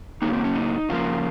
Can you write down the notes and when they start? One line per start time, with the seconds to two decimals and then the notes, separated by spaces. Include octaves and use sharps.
0.22 C#3 F#3 A#3 D#4
0.33 C4
0.44 C#4
0.55 D#4
0.89 C#3 F3 A#3 F4